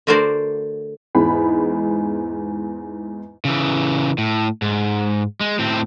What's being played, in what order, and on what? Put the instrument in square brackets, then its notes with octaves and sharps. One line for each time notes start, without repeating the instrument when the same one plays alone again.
[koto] D3 A3 F#4 A#4 C5 D5
[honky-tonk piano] E2 G#2 G#3 B5
[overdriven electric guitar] C#3 E3
A2
G#2
G#3
A2 C4